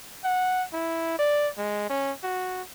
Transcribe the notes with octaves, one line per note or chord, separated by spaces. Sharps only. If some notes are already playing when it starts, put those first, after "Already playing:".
F#5
E4
D5
G#3
C#4
F#4